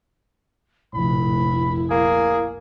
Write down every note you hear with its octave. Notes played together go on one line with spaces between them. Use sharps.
F1 A#1 A2 E4 B5
A#3 G#4